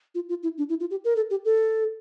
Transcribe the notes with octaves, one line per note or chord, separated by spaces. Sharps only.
F4
F4
E4
D4
E4
F4
G4
A#4
A4
G4
A4